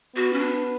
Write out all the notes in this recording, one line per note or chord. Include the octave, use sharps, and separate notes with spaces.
B3 F#4
C#4
D4